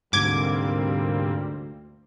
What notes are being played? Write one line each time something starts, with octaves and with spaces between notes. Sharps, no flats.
D2 G#2 C3 G3 A#3 C4 D6 G#6